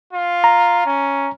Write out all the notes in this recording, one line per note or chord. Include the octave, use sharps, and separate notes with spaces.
F4
A#5
C#4